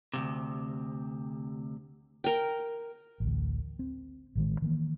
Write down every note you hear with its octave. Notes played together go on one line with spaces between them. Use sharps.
D2 G#2 C3
A#4 G5
A1 D2
C4
A1 D#3 G#3
D#3 E3 A#3